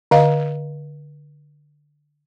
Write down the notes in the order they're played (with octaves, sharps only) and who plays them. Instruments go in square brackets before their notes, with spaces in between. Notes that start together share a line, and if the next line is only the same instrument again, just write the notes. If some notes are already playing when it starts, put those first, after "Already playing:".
[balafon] D3 D#5 F5